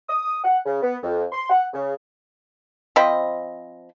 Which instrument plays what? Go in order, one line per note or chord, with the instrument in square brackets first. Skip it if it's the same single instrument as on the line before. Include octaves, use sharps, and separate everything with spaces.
[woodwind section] D#6
F#5
C#3
B3
F2
C6
F#5
C#3
[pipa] F3 C4 D#5 B5